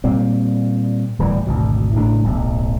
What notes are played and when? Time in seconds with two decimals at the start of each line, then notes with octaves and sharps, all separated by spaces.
0.04 A#2 G3 A#3 C4
1.19 D1 E3 G3
1.47 G#1 D2 B2
1.95 A1 A2 C#3 D4
2.24 D1 B1